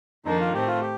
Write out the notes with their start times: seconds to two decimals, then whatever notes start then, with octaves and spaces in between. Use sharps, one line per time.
0.25 F2 D#3 A#3 D4 D#4
0.40 F4
0.54 A2 A3 C4 G4
0.67 F4
0.81 G4